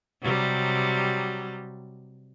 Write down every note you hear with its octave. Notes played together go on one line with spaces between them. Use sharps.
C3 F#3 G3